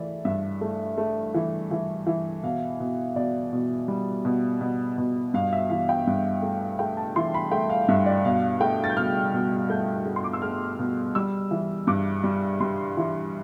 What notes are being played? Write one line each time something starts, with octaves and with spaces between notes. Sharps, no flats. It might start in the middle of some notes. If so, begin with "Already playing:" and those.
Already playing: E3 A3 D5 E5
G2 E5
A3
A3
E3
E3
E3
B2 F5
B2
B2 D5
B2
G3
B2
B2
B2
G2 F5
E5
E3 F5
G5
G2
A3
A3 G5
A5
E3 C6
B5
A3 G5
F5
G2 E5
D5
B2 F5
A3 G5
A6
G6
B2 F6
B2
A3 G6
A3
C6
D6
E6
A3 F6
B2
G3 E6
E3
G2 D6
G3
G3 C6
E3